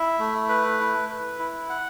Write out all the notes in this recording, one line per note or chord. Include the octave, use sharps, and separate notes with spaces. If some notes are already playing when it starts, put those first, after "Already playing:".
Already playing: E4 E5
A3
B4
E4
B4
E4
F#5